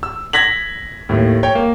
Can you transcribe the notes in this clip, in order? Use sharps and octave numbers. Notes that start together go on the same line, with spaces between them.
E6
G#6 A#6 B6 F#7
D#2 A2
C#5 G5
A#3